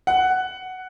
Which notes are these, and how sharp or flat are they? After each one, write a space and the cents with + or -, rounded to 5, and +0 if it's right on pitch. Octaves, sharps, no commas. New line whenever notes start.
F#5 +5